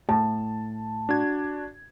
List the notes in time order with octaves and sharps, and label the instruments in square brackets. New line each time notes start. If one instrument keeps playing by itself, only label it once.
[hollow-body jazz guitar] A2 [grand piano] A5
[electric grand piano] D4 F#4 G#6